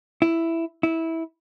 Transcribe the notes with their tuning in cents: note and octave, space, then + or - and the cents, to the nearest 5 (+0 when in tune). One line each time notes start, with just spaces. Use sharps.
E4 +5
E4 -15